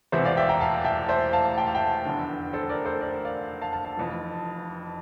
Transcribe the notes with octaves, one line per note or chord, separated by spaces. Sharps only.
E1 E2 C3 E3 C5 E5
D5 F5
E5 G5
G5 A#5
F5 A5
E5 G5
C5 E5
F5 A5
G5
F5
E5 G5
F1 E2 D3
A4 C5
A#4 D5
A4 C5
A#4 D5
D5 F5
F5 A5
F5 A5
F5 A5
F1 F2 E3